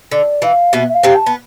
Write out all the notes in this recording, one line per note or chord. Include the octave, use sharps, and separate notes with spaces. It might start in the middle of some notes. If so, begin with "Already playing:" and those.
D3 D5
E3 F5
B2 B3 E5
E5
F5
C3 C4
A5
B3